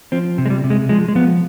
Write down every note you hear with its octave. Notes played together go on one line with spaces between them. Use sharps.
F3 C4
C3
G#3
G3
C3
G#3
F3 G#3
G#3
F3 B3